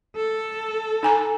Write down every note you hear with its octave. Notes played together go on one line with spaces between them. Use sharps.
A4
D#4 G#5 A#5